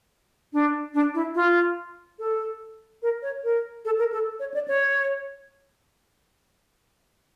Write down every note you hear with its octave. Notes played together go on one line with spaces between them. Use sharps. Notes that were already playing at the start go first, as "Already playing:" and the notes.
D4
D4
E4
F4
A4
A#4
C#5
A#4
A4
A#4
A4
C#5
D5
C#5